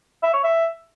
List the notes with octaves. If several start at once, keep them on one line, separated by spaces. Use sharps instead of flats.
E5
C#5
E5